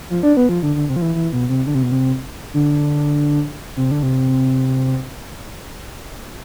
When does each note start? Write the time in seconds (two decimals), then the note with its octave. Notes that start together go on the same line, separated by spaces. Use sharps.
0.10 F3
0.23 D4
0.37 B3
0.49 F3
0.63 D3
0.76 D3
0.89 C3
0.96 F3
1.02 E3
1.15 E3
1.33 B2
1.49 C3
1.67 D3
1.75 C3
1.83 B2
1.92 C3
2.54 D3
3.77 C3
3.91 D3
4.03 C3